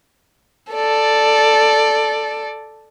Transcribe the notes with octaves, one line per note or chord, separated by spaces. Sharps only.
A4 D5